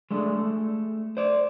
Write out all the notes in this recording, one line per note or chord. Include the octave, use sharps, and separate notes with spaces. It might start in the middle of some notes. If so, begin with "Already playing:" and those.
G#3 A3 D4
A3
C5 D5